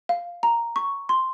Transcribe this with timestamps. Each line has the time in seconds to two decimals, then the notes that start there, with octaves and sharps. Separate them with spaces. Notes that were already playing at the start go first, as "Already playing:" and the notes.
0.09 F5
0.43 A#5
0.76 C#6
1.09 C6